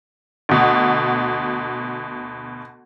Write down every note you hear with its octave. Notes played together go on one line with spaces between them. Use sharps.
D2 B2